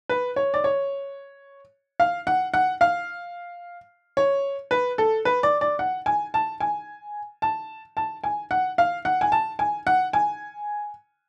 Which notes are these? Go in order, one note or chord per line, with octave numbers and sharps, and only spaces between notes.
B4
C#5
D5
C#5
F5
F#5
F#5
F5
C#5
B4
A4
B4
D5
D5
F#5
G#5
A5
G#5
A5
A5
G#5
F#5
F5
F#5
G#5
A5
G#5
F#5
G#5